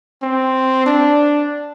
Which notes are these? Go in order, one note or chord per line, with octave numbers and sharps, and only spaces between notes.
C4
D4